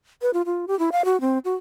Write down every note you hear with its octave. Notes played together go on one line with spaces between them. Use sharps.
B4
F4
F4
G4
E4
F5
F#4
C4
F#4